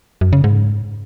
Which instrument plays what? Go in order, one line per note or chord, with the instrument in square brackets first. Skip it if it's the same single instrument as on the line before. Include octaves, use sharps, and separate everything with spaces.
[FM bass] F#2
C#3
G#2